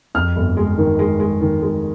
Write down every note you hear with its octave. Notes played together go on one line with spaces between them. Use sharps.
F2 F6
G1
G#3
D#3
G#3
G#3
D#3
G#3